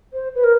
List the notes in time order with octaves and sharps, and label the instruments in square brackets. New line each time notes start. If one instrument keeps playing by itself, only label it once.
[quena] C5
B4
A#4